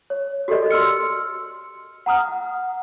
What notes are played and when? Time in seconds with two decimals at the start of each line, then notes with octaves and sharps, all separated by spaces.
0.10 C#5
0.48 F#4 G4 A4 A#4 D5 D#5
0.71 C6 E6 F6 C#7
2.06 F#5 A#5 D#6 F6
2.28 F#5